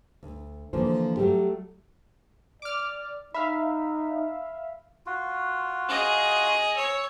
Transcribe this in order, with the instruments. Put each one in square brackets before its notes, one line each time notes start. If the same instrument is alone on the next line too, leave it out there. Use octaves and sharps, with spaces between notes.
[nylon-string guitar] D2
D3 E3 F3 A#3 C5
F#3 G3 A3 D4 G4
[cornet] D5 [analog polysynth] D6 F6
[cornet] D#4 [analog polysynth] E5 F5 [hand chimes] B5
[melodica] F4 F#4
[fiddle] G#4 D#5
[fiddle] C#5 [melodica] E6